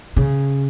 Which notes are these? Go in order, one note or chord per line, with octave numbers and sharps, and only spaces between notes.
C#3